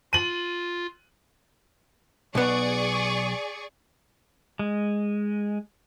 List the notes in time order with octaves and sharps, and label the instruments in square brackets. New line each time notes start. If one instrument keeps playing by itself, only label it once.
[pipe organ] F4 [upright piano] D#7 F#7
[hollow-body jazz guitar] B1 B3 [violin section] G#4 D5 C#6
[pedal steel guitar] G#3